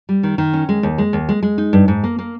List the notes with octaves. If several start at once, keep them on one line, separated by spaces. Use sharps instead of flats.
G3
D#3
D#3
C#4
G#3
D#2
G#3
D#2
G#3
G#3
D#4
G2
G#2
A#3
A#3